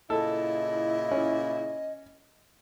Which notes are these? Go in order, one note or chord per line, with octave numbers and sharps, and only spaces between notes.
A#2 C#3 E4 A4 D#5
C#4